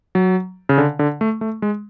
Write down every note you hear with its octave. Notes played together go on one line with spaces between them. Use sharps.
F#3
C#3
D3
D3
A3
A3
G#3